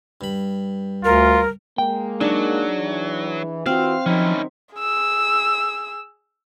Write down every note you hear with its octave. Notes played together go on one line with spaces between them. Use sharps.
G2 B5
D2 F4 A#4
G#3 A#3 G5
F#3 D4 D#4 G#4
E3
E3 C4 F4 F#4 F5
D#3 F3 F#3 C#4 D#4 E4
G#4 E6